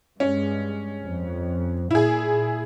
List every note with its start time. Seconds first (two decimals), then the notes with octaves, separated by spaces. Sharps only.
0.20 G2 G#3 C#4
1.03 F2
1.91 A#2 E4 G#4